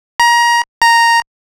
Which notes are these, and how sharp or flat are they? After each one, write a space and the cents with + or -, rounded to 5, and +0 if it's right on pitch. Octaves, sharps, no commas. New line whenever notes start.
A#5 +25
A#5 -5